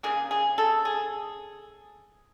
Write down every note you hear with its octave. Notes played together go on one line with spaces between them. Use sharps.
C#3 F#3 A#3 G#4
G#4
A4
G#4